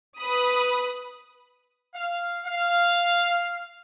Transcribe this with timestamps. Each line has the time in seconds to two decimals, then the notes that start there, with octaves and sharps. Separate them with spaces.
0.18 B4 B5 D#6
1.94 F5
2.45 F5